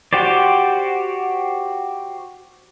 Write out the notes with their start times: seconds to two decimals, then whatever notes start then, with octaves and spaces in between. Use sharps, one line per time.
0.13 F#4 G4 C5 D5